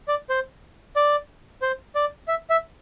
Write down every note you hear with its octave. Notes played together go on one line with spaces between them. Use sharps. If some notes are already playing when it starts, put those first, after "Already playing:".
D5
C5
D5
C5
D5
E5
E5